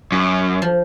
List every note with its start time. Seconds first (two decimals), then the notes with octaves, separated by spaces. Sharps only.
0.12 F#2
0.62 F3